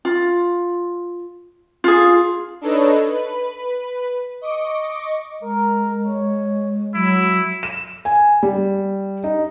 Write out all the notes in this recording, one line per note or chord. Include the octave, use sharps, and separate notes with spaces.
F4
F4 G#4
D4 D#4 A4 B4 C#5 D#5
B4
D#5 C#6 D6
G#3 A#4
C#5
F#3 E4
E7
G#5
G3
D#4